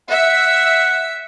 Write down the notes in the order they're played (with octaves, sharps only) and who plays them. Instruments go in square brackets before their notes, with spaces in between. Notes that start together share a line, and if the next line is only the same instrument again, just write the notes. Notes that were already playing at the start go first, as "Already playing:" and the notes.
[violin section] E5 [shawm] F#5